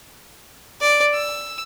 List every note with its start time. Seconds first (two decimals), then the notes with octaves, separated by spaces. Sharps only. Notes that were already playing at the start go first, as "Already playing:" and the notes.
0.81 D5
1.14 E6